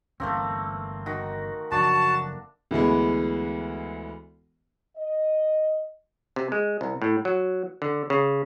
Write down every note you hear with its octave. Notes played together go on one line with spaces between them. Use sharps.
G1 E3 A3 A#3 C4 C#4
D#3 F#4
F#1 F3 D4 F#4 A5
D2 E3 G#3 B3
D#5
C3
G#3
C2
A2
F#3
D3
C#3